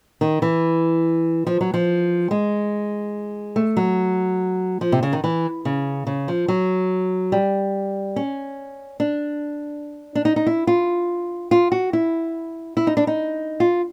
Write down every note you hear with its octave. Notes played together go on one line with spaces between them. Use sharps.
D#3
E3
F3
F#3
F3
G#3
A3
F#3
F3
C3
C#3
D#3
E3
C#3
C#3
F3
F#3
G3
C#4
D4
D4
D#4
D#4
E4
F4
F4
F#4
E4
E4
D#4
D4
D#4
F4